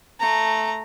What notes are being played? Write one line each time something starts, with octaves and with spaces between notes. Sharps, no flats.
A3 A#5